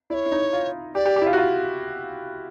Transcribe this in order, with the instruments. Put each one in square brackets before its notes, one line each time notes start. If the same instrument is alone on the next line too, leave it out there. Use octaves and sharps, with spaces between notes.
[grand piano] E4 [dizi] D5
[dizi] C#5
[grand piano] E4
D#4
F4
[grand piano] G4 [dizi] D5
[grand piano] G4
G4
E4
F4
F#4
F4